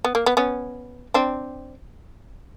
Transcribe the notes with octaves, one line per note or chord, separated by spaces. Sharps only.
B3
A#3
B3
B3 C#4
C4 D4